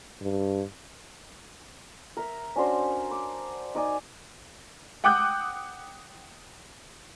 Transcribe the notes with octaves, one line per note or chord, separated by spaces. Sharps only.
G2
A#4 E5
C#4 D4 F#4 C5
D6
D#4 D5 G#5
F#5 G5 D6 D#6 F#6 G6